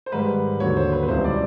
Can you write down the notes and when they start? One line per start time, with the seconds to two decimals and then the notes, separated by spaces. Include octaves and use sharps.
0.06 C5
0.12 G#2 D#3 G3 B4
0.60 D#2 D3 F#3 C#5
0.77 C5
0.92 B4
1.03 B4
1.08 C#2 B2 G3 C4 E4 C5
1.24 D5